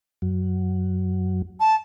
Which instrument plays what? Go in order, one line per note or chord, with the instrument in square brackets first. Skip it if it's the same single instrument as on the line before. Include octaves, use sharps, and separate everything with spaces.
[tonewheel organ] F#2 F#3
[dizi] A5